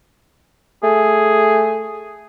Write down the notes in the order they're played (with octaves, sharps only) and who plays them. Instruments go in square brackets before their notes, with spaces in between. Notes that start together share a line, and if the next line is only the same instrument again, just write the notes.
[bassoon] A3 [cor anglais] G#4